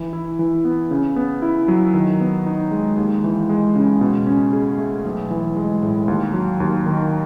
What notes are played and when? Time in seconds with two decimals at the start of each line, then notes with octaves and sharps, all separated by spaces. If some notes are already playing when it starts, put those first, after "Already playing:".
Already playing: E3
0.13 E4
0.39 E3
0.65 B3
0.91 C#3
1.16 B3
1.42 E4
1.68 F#3
1.94 D#3
2.20 B3
2.46 D#4
2.71 G#3
2.97 D#2
3.24 E3
3.49 G#3
3.75 C#3
4.01 B2
4.26 C#4
4.53 G#4
4.78 A3
5.05 B1
5.30 E3
5.57 G#3
5.83 A2
6.08 D#2
6.34 F#3
6.60 D#2
6.86 D#3